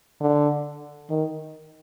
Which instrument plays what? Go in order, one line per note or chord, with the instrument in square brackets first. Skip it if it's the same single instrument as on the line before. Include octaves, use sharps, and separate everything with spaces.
[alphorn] D3
D#3